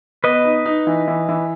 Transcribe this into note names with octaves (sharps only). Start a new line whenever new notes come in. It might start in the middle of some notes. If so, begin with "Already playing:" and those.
B3 B4 D#5
D#4
D#4
E3
E3
E3